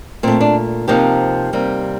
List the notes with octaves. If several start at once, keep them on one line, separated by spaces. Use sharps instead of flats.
A#2 A3 C4
D4
C3 F3 A#3 D#4 G4
C3 G3 A#3